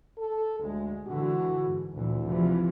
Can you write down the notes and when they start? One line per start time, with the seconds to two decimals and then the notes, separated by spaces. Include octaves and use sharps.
0.18 A4
0.60 D2 G#3
1.07 D3 E3 F#4
1.66 G#2
1.94 D2 A#2 E3
2.25 C3 E3 F3